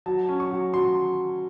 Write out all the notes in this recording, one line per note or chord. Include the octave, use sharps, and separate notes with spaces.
F#3 A5
C#4
C#6
F#3
F#3 C6